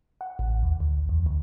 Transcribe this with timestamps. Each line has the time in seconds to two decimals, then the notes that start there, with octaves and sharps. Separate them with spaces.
0.21 F#5
0.39 A1
0.63 D#2
0.80 D2
1.09 E2
1.26 D2